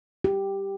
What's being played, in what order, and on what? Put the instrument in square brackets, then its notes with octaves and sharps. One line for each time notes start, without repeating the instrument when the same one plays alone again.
[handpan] G4